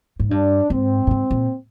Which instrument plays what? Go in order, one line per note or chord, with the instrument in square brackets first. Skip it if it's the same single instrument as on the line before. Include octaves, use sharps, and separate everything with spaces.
[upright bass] G#2
[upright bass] G2 [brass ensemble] D4
[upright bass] G#2 [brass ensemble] C4
[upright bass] A#2
G#2
A#2